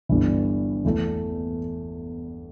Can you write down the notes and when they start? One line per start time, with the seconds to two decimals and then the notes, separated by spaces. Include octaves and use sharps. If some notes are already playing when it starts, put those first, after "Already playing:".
0.09 G1 G2 E3
0.84 E2 E3 A3